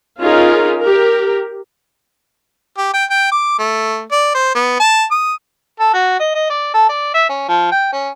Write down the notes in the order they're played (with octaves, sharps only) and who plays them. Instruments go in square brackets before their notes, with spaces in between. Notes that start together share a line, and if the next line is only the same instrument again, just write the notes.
[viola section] C#4 D#4 F4 G#4 A#4
G4 A#4
[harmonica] G4
G5
G5
D6
A3
D5
C5
B3
A5
D#6
A4
F#4
D#5
D#5
D5
A4
D5
E5
C#4
F3
G5
C#4